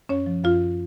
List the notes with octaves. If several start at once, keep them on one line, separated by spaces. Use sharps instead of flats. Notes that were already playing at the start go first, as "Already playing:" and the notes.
F#2 C#4 C#5
F3
F#2 F4 F5